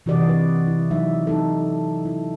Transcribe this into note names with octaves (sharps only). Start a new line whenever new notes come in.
C3 E3 F#4 G4 D5 D#5
B4
E4
F#3 D#4 E5
D#4 A4
E4